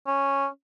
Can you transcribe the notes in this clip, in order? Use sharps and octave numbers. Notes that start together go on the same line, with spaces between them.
C#4